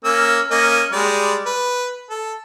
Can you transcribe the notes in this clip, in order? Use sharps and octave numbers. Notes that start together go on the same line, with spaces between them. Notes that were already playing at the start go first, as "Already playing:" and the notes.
A#3 C#4 E6
A#3 C#4 D#5
G3 G#3 D5
B4
A4